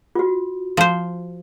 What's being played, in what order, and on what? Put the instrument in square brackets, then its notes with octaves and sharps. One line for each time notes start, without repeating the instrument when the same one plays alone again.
[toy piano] F4 F#4
[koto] F3 C5